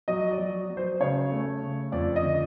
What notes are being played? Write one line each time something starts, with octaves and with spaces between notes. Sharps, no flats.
F#3 D#5
D5
F#3
F#3
C5
C#3 C#5
A3
C#3
F2 D5
D#5
D3